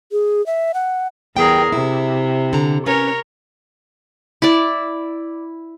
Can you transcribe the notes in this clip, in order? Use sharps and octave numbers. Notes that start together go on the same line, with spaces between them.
G#4
E5
F#5
E2 G3 G#4 A#4 G5
C3 E4
D3 A#5
C#4 F#4 A#4 B4 C#5
E4 D5